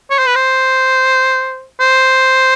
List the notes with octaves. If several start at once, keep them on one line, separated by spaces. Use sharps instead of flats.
C#5
C5
B4
C5
C5